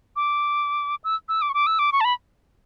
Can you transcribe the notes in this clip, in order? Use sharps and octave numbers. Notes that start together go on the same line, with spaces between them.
D6
E6
E6
D6
C#6
D6
E6
D6
C#6
A5
B5